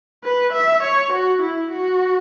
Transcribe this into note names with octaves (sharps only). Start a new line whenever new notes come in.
B4
E5
C#5
F#4
E4
F#4